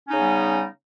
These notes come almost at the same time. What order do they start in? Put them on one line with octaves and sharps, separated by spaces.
C#4 D#4 C#3 B3 G3